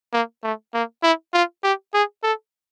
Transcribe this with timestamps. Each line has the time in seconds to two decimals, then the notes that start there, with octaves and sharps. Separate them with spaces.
0.13 A#3
0.43 A3
0.74 A#3
1.03 E4
1.34 F4
1.63 G4
1.94 G#4
2.23 A4